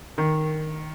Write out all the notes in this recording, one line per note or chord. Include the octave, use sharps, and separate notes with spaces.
D#3